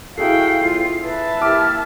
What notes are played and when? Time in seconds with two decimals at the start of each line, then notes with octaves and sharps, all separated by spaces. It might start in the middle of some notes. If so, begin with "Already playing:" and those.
0.18 E4 F#4 G#4 A4 F5 G5 C7
0.61 B1 F4
1.05 B4 E5 A5
1.42 A#3 E4 G4 D6 F6